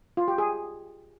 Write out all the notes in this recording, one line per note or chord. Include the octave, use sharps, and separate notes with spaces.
F4
G4
G#4